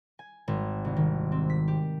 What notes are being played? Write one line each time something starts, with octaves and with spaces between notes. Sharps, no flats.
G#5
G#1
C2
D#3
C4
B6
G4